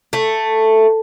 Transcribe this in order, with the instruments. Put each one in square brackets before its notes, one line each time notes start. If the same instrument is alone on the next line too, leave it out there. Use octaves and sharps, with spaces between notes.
[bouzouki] A3